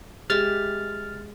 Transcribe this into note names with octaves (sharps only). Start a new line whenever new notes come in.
G#3 G4 E5 F6 A6